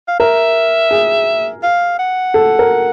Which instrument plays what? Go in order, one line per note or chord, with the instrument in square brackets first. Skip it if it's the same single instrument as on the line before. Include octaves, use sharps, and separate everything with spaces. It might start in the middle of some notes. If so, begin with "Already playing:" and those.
[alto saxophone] F5
[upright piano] A#4 [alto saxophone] E5
[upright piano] G#4
[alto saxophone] F5
F#5
[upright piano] A4
A#4